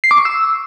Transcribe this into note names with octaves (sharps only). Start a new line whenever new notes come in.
C7
D6
C#6
E6